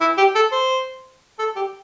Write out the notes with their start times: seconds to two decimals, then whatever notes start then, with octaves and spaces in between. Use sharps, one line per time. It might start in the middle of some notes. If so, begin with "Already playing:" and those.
0.01 E4
0.18 G4
0.35 A4
0.52 C5
1.39 A4
1.56 G4